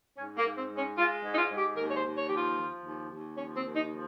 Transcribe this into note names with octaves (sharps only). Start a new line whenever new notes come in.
G#2 C#4
A#3
G#2
C4
G#3
C#4
G#3 F4
G#2
D#4
F4
G#2
G4
D#2 A#4
C#5
C5
D#2
C#5
F3 G4
F4
F3
D#2
D#2
F3 C#4
C4
D#2
D#4
F3